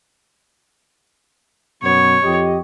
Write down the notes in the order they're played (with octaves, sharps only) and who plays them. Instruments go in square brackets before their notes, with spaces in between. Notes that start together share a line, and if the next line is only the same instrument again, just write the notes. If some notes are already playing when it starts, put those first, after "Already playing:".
[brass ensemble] F#2 B2 B3 [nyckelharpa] C#5
[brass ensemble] F2 G4 D#5